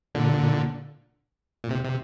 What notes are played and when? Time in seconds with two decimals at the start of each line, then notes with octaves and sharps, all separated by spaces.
0.15 A#2 D3
1.64 A#2
1.70 C3
1.84 C3